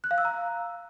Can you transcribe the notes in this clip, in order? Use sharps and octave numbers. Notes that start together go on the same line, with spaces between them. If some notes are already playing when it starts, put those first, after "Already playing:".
F#6
F5
E6
A#5